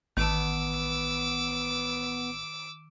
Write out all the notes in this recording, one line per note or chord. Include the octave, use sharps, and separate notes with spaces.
A1 D#3 B3 A5 D6 E6